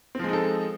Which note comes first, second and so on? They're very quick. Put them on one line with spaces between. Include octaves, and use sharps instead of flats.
C4 F3 G#3 D#4 A4